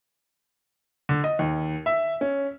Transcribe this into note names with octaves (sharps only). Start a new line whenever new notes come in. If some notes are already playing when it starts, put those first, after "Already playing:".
D3
D#5
D#2
E5
C#4